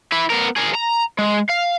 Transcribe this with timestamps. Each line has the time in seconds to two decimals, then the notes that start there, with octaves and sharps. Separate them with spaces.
0.12 E4 B4
0.30 B3 A#4
0.56 G#4 A#4
0.75 A#5
1.19 G#3
1.50 F5